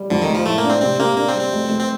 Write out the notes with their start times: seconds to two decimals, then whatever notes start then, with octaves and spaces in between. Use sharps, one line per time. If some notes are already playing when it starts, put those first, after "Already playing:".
Already playing: G3
0.10 F2 D3
0.22 D#3
0.28 F1
0.34 F3
0.45 A2 A3
0.58 A#3
0.64 D4
0.69 C4
0.81 C3 C4
0.99 C3 A#3
1.17 A#3 D4
1.28 C4
1.35 G3
1.41 C4
1.53 F1
1.70 F1
1.80 C4